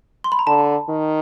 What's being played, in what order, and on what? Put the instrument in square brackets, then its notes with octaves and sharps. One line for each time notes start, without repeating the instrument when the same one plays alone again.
[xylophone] C6
B5
A#5
[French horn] D3 [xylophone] A5
[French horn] D#3